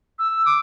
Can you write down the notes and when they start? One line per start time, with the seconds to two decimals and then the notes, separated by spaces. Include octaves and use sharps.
0.19 E6
0.46 D6